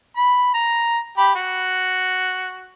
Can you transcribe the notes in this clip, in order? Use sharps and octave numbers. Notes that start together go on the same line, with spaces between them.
B5
A#5
G4 B5
F#4